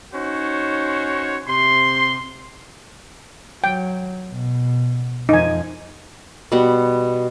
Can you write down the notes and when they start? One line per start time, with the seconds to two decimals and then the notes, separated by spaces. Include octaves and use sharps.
0.13 C#4 D#4 F#4 C5 C#5
1.47 C3 C6
3.64 F#3 G5
4.30 B2
5.29 F2 F3 D#4 G#5
6.52 B2 G3 B3 F#5